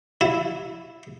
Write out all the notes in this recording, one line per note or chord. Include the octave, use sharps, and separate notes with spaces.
E4